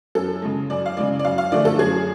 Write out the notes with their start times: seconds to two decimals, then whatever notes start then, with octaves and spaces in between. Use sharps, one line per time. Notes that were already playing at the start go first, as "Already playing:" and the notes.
0.15 F#2 A4
0.42 C#3 G#3
0.70 F#2 D5
0.86 F5
0.97 C#3 G#3 D5
1.19 D5
1.25 F#2 F5
1.38 F5
1.52 D3 F3 A3 D5
1.65 A4
1.79 F#2 G#4